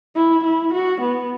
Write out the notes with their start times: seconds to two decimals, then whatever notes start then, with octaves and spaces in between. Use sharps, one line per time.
0.16 E4
0.44 E4
0.73 F#4
1.01 B3